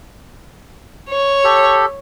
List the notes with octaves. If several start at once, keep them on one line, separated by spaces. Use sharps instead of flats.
C#5
G4 A4